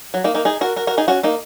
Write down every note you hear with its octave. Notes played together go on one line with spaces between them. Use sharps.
F#3
A#3 D#4
A#3 D#4
D#4 G#4
F#4 A#4
F#4 A#4
F#4 A#4
D#4 G#4
C#4 F#4
A#3 D#4